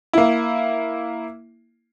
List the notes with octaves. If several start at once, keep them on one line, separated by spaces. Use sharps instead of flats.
A#3 E4